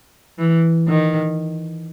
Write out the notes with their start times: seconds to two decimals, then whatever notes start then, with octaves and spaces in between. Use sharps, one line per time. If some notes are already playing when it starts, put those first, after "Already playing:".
0.38 E3
0.87 D#3